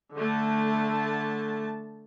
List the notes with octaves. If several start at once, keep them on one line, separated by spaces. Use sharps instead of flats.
D3 A3 A5